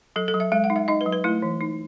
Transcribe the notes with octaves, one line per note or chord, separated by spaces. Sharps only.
F#3 A4
A4
F#3
E5
G#3 E5
F#5
D#4
E5
D#4 D#5
B4
F#3
B4
A3 E4
E3
D#4